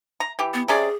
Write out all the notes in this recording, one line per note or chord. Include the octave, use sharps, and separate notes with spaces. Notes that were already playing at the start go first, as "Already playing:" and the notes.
A#5
E3 G4
B3
C3 C#4 G#4 D5